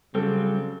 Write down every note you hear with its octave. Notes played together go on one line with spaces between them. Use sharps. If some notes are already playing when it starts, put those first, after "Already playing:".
C#3 F#3 G3 C4 A4